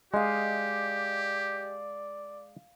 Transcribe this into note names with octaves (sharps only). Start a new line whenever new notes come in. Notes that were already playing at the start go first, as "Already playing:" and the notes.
G#3 G4 D5 D#5 F5